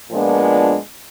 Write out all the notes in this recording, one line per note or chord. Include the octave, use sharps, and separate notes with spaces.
A#2 F3 G#3 B3 D4